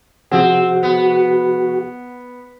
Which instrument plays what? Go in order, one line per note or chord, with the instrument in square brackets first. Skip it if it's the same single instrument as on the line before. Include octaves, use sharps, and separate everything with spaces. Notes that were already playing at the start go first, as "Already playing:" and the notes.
[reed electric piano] C3 F3 G#4 [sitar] C4 [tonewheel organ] F#4 [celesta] F#5
[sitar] B3